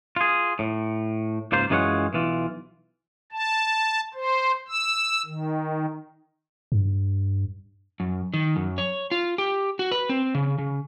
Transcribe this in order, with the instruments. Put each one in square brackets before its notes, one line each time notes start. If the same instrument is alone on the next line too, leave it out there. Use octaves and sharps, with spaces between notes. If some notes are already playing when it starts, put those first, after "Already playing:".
[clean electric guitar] F4 G#4
A2
C#2 G#2 A#3 F4 C5
F#2 E3 G#3 F4 C#5 F#5
B1 E3 F4
[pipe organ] A5
C5
E6
D#3
[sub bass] G2
[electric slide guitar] F#2
D#3
F#2
C#5
F4
G4
F#4
B4
C4
C#3
C#3